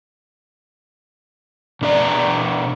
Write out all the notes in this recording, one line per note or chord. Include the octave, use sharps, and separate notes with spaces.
B2 D4 A4 D5 A#5